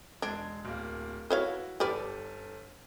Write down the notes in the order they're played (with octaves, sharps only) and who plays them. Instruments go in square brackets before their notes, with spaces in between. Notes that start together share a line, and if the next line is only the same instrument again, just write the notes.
[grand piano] E1 G#3 G#6 [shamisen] D4
[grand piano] D1 A#3
[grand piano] E4 F#4 [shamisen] B4 C#5 F5
[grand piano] G1 A4 F6 [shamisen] G4 B4 D5